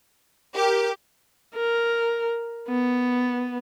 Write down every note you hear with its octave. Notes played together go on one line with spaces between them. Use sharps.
G4 A#4
A#4
B3